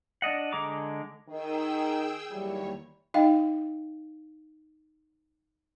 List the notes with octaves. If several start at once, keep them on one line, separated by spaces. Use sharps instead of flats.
D4 D5 D#5 F#5
D3 G#3 A#5 D6
D#3 G#4 G5 E6
D#2 E3 F#3 G3 C#5
D#4 D#5 F5 G5